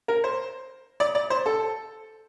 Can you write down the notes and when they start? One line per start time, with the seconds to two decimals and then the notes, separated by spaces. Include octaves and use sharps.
0.08 A#4
0.24 C5
1.00 D5
1.15 D5
1.30 C5
1.46 A4